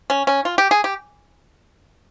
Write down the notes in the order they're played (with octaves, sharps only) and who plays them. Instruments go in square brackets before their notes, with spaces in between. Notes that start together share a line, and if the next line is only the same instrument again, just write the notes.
[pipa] C#4
C#4
F4
G4
G#4
G4